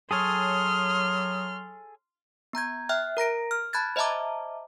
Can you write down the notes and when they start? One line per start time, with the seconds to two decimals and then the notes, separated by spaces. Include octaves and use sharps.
0.11 F#3 G#4 A4 C#5 C6 D#6 F6
2.53 B3 A#5 G6 G#6
2.89 E5 G5 F6 F#6
3.17 A#4 A#5 A#6 D7
3.51 F6
3.73 A5 B5 F#6 G#6 A6
3.96 C5 D#5 E5 A5 A#5 D6